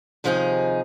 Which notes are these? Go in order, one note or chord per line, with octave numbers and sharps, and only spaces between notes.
D#2 C3 F3 D#4 E4 G#4